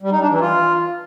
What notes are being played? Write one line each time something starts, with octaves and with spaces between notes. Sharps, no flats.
G3
D#4
D4
E3
F4